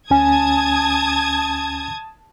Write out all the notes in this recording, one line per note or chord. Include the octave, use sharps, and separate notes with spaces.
D2 C#4 G#5 A5 D#6 G#6